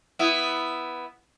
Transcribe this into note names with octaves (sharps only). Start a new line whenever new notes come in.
B3 E4